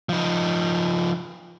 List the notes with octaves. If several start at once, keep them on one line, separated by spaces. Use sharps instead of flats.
F3 D#4